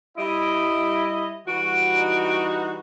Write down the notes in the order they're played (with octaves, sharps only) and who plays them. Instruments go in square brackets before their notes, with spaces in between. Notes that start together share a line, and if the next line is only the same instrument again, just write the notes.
[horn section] G3 D#5 [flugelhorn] E4 [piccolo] D7
[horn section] E3 G3 F#4 [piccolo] D7
[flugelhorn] D#4